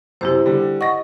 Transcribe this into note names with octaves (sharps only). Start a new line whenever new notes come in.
F#2 C3 E4 G4 C5
D3 G3
D#5 F#5 C#6 A#6